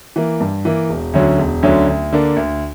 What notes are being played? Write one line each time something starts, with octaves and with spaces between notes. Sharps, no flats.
E3 A#3
G2
E3 A#3
E1
D2 D3 F#3 C#4
E1
D2 D3 F#3 C#4
D2
D3 A#3 D4
D2